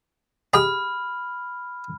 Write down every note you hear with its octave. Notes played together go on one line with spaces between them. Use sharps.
G4 G#4 D#5 B5 F6